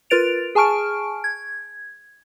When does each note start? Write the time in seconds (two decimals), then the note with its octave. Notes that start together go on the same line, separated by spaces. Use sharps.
0.10 F4 A#4 B4 A6 D7 F7
0.55 G#4 G#5 A5 C#6 F6 D7
1.24 G#6